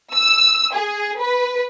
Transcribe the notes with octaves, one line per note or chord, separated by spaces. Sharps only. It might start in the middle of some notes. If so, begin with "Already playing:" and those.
E6
G#4
B4